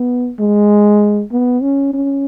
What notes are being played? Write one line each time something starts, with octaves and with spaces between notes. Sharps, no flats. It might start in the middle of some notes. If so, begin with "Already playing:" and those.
Already playing: B3
G#3
B3
C#4
C#4